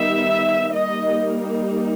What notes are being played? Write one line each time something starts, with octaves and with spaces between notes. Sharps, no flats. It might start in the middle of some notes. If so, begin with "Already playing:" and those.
Already playing: D#3 G3 B3 D#4 E5
G3 A#3 D#4 D#5